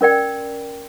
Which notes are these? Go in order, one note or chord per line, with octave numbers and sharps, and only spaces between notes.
C#4 A#4 D5 G5